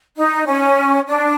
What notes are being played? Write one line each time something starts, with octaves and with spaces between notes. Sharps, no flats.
D#4
C#4
D4